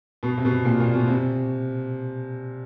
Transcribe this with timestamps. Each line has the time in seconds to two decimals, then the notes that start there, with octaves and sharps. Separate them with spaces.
0.23 B2
0.38 C3
0.45 B2
0.65 A#2
0.80 A#2
0.94 B2
1.08 C3